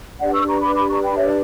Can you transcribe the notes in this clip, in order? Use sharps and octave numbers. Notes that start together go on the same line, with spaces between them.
D4 G4 B4 D5 F#5
C#6 E6
A#5 C#6
B5 D6
B5 D6
A#5 C#6
G5 B5
C#5 E5